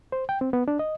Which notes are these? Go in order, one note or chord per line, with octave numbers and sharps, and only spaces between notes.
C5
G5
C4
B3
D4
D#5